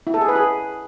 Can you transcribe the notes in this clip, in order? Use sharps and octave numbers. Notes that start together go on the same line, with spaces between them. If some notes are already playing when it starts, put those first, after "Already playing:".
E4
A4
G#4
B4
G#4